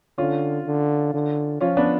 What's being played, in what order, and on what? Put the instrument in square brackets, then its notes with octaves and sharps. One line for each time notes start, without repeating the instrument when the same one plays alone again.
[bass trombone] D3 [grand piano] C#4 F4
[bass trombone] D3
D3
[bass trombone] F3 [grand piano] C#4 F4
[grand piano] B3 D4